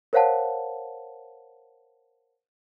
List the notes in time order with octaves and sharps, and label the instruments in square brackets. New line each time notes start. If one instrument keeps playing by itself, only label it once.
[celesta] A#4 C5 C#5 F5 F#5 A5